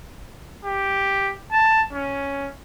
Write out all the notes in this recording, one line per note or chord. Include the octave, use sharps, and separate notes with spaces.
G4
A5
C#4